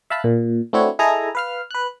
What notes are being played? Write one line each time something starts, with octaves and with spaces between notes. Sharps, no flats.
E5 F5 A5 B5 F#6
A#2
A3 C4 D4 E4 F#4 C#5
E4 G#4 A4 D#5 G#5 A#5
B4 F5 F6
B4 F#6